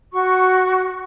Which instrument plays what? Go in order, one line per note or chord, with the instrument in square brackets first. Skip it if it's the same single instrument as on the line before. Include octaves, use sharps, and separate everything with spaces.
[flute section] F#4 C#6